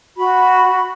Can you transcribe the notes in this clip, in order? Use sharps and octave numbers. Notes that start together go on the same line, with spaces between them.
F#4 B5